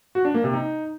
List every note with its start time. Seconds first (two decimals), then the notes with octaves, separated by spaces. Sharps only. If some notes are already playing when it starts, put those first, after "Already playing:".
0.15 F#4
0.25 D4
0.34 A#3
0.44 C3
0.53 D#4